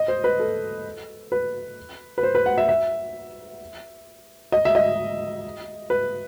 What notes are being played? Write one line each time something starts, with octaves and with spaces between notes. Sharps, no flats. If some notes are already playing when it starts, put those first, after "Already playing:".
Already playing: D#5
C5
B4
A4
B4
B4
C5
B4
F#5
E5
E5
D#5
E5
D#5
B4